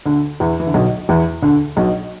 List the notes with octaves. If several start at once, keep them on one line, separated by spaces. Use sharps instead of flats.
D2 D3
E2 E3
E3
D3
B1 B2
E2 E3
D2 D3
B1 B2